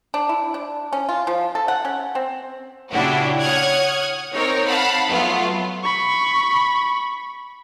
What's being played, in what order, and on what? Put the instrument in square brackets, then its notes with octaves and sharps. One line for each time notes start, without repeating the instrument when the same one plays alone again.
[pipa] D4
E4
D4
C#4
F4
F3
A4
F#5
C#4
C4
[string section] A#2 C#3 D4 E4 F#4 G4
C#5 F#5 D#6 F6 F#6 G#6
C4 D#4 A#4 C#5
F5 F#5 A5 B5
F#3 A3 B3 F4
[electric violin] B5 C#6